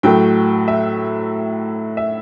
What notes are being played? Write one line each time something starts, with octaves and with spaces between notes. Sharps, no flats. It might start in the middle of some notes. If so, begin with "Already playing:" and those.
A2 F#3 A3 G5
E5
E5